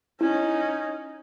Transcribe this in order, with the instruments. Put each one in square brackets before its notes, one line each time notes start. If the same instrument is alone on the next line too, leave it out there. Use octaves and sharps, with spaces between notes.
[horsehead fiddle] C#4 D#4 [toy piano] E4